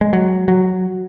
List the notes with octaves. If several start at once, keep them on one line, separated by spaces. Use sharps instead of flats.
G#3
F#3
F#3